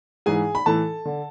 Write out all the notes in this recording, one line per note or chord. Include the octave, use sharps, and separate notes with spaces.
G#2 E3 G#4 G#5
B5
A2 E3 A4 A5
D3